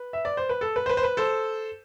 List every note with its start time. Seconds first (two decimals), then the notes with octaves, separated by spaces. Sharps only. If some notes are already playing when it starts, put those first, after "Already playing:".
Already playing: B4
0.13 E5
0.25 D5
0.37 C5
0.49 B4
0.61 A4
0.76 B4
0.86 C5
0.89 B4
0.97 C5
1.03 B4
1.17 A4 C5